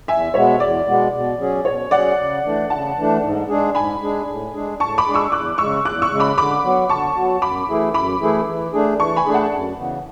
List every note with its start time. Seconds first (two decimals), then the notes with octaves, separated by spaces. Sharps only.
0.08 E2 E5 G#5
0.34 B2 G#3 B3 C#5 E5
0.60 E2 D5
0.87 B2 G#3 B3
1.13 B2
1.39 F#3 C#4 G#4
1.65 B2 C#5
1.91 F#3 C#4 G#4 D5 F#5
2.18 C#3
2.44 E3 A3 D4
2.70 C#3 F#5 A5
2.96 E3 A3 D4
3.23 G#2
3.49 G#3 D4 G#4
3.75 G#2 G#5 B5
4.01 G#3 D4 G#4
4.28 A2
4.54 G#3 D4 G#4
4.80 A2 A5 C#6
4.98 B5 D6
5.06 G#3 D4 G#4
5.14 C#6 E6
5.32 E2 D6 F#6
5.58 C#3 G#3 C#6 E6
5.85 E2 D6 F#6
6.02 C#6 E6
6.11 C#3 G#3
6.20 B5 D6
6.37 D3 B5 D6
6.64 F#3 B3 F#4
6.89 D3 A5 C#6
7.16 F#3 B3 F#4
7.42 F#2 B5 D6
7.68 E3 A3 E4 G#4
7.94 F#2 B5 D6
8.20 E3 A3 E4 G#4
8.47 E3
8.73 A3 D4 G#4
8.99 E3 A5 C#6
9.16 G#5 B5
9.26 A3 D4 G#4
9.34 F#5 A5
9.52 F#2
9.77 C#3 E3 B3